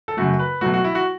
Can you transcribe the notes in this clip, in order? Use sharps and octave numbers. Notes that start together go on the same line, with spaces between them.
A4
F#2 C#3 A3 F#4
B4
B2 F#3 A3 F#4
F#4
E4
F#4